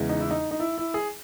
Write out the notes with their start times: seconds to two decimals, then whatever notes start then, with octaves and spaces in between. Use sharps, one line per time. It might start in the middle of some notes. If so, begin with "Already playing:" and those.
Already playing: E2 C#3 E3 G#3
0.09 D#4
0.20 E4
0.31 D#4
0.51 D#4
0.60 E4
0.78 E4
0.94 G#4